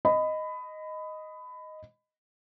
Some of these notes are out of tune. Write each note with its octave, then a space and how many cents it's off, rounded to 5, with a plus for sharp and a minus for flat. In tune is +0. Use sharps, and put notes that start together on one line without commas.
D#5 +0 B5 +20